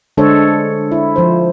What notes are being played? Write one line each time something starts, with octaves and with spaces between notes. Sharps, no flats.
D3 G#3 D4 A4 C5 C#5
E4
F3 C5